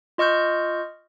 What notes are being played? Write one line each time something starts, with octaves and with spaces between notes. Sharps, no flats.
F4 D#5 C#6 F6 G6